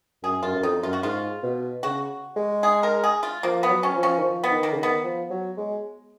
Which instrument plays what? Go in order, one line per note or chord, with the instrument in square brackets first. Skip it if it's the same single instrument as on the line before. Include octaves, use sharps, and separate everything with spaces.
[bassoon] F#2 [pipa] G#4
[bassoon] F#2 [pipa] F4
[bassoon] F#2
[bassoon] F2 [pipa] D#4
[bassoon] F#2 [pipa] F4
[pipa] F#4
[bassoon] G#2 [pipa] F4
[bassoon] B2
[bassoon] C#3 [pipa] F#4
[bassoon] G#3
[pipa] G#4
A#4
G#4
F4
[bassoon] F3 [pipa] A#3
[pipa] B3
[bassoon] F#3
[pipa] C#4
[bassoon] F3
[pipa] C#4
[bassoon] D#3
F3
[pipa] B3
[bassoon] D#3
[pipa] A#3
[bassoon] C#3
D#3
[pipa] B3
[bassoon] F3
F#3
G#3